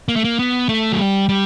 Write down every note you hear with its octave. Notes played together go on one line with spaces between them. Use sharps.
A#3
A3
A#3
B3
A3
F#3
G3
G3